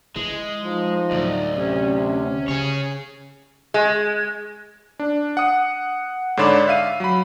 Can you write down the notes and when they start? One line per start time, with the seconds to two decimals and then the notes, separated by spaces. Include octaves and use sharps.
0.16 E3 G#3
0.64 F3 D#4
1.11 D2 A2 F#3
1.57 C3 C#4
2.05 C#4
2.48 C#3 G#4 C#5
3.74 G#3
4.99 D4
5.37 F#5 D#6
6.37 G#2 D3 C#5 D5 B5 E7
6.68 E5 F5 D#7
7.00 F#3 B5